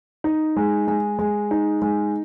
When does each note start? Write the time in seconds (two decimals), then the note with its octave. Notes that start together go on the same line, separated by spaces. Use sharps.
0.24 D#4
0.56 G#3
0.88 G#3
1.19 G#3
1.51 D#4
1.82 G#3